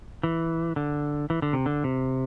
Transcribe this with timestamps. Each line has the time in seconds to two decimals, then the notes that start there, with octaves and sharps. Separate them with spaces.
0.23 E3
0.76 D3
1.30 E3
1.42 D3
1.53 C3
1.66 D3
1.84 C3